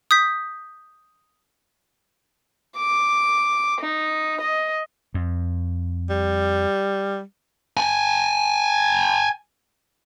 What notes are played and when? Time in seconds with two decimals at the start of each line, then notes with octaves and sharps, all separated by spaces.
0.11 D#6 G6 B6
2.77 D6
3.81 D#4
4.41 D#5
5.14 F2
6.10 G3
7.77 G5 G#5